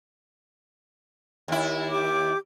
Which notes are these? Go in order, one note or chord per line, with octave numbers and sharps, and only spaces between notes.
D#2 E4
G4 D6